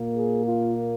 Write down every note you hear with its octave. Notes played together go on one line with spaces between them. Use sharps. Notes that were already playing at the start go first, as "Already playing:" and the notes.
Already playing: A#2 A#3
G#4
F4